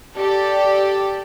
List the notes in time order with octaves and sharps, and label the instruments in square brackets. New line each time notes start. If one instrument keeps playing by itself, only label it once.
[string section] G4 A4 D5